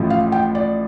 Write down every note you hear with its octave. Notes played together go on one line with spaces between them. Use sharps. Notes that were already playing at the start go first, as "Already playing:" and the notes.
Already playing: A1 A2 F3
F5
G5
D5